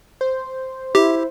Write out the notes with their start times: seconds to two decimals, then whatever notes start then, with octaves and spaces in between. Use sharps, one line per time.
0.21 C5
0.95 E4 G4